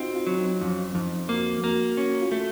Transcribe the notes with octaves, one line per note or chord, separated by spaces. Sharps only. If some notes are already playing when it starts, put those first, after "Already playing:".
Already playing: C4 D#4 F4 F#4
F4
F#3
D#4
F2 C#4
F2 D#4
A#3 F#4
A#3 F#4
C#4 F#4
F4
A3